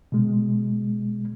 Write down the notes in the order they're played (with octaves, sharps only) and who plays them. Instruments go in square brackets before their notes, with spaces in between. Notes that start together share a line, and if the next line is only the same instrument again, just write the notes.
[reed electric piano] B2 G#3